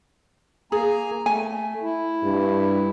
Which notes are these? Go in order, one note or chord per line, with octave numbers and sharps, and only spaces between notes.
A#3 G#4 G#5 A#5
A3 G#5
E4
G2